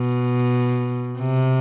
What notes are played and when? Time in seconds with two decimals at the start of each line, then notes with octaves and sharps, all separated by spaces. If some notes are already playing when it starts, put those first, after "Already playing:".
Already playing: B2
1.19 C3